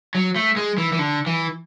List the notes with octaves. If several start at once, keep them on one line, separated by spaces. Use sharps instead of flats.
F#3
A3
G#3
E3
E3
D3
E3